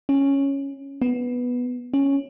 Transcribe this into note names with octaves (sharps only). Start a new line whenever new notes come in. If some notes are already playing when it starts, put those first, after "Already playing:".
C#4
B3
C#4